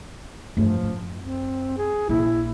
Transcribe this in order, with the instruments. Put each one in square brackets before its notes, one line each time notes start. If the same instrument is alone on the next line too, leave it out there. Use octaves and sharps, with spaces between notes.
[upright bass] G2 A3 [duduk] F3
[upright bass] F#2
[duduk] C4
G#4
[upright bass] A#1 [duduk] E4